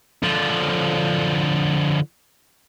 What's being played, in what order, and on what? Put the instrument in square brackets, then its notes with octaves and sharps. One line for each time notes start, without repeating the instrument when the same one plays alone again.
[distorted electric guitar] D3 F3